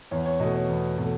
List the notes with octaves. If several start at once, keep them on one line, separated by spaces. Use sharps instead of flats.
E2 C#5
C#5
B2 A3 D#5
C#5
E2
B2 A3